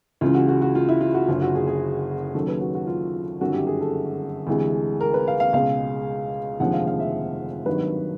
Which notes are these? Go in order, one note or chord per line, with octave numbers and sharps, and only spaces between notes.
C#2 C#3 E3 F4
F#4
F#4
F#4
F4
E4
F4
F#4
F#1 F#2 D3 F4
F#4
G#4
G#4
D#2 C#3 F#3 A4
B4
F#4
F#4
F4
G1 F#2 D#3 F#4
G4
G#4
A4
D2 C3 E3 G#3
A#4
B4
F5
F5
C#2 B2 G#3 F5
F1 D#2 D3 F3 G#3 F#5
F5
F5
E5
G#1 G2 D#3 F#3 B4